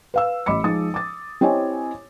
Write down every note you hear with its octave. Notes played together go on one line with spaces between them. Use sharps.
B4 F5 E6
A1 D#5 B5 D6 C#7
F3 G#3 D#4 D#6 A6
D6 A6
C4 E4 G4 C#5 D#5 G#5